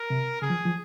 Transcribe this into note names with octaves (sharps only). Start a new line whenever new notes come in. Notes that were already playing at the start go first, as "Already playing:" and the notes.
Already playing: A#4
C3
C#3 G#4
F3
F3